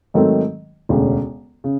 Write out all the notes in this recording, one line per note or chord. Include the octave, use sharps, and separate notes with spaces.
G#2 D#3 F#3 A3 C4
E1 D2 C#3
C#3